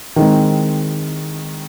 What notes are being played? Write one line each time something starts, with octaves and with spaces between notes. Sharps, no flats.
D#3 G#3 C4